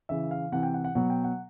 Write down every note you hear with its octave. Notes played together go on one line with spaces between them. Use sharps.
C#3 E3 E5
F5
C3 E3 F#5
G5
F#5
F#5
B2 F#3 F#5
G5
F#5